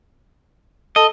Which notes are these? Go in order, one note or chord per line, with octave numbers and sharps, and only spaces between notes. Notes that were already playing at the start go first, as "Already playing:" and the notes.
A4 D#5